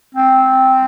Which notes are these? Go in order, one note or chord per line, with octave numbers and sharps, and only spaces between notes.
C4